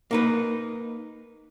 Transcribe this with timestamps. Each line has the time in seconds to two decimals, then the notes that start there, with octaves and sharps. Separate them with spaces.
0.11 A#3 D#4 B4